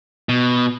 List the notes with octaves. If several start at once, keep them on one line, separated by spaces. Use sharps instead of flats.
B2